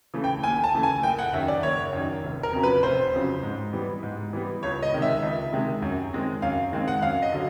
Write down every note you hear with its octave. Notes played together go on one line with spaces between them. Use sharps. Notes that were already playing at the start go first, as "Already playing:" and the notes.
C#3 E3 A3
G5
D#2 G#5
A5
C#3 E3 A3
G#5
F#1 G5
F#5
F#2 D#3 E5
D5
F#1 C#5
F#2 D#3
F1
A#4
F2 C#3 F#3
B4
F1 C5
F2 C#3 F#3
G#2
E3 G3 B3
G#2
E3 G3 B3
C#2 C#5
D#5
C3 D#3 G#3
E5
C#2
C3 D#3 G#3
F#2
D#3 G#3 C4
F#2 F5
D#3 G#3 C4
F#5
F#2 F5
D#5
D3 F#3